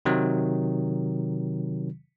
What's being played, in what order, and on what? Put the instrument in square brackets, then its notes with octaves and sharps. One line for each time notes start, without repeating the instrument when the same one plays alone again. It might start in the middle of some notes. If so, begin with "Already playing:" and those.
[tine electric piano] C3 D#3 F#3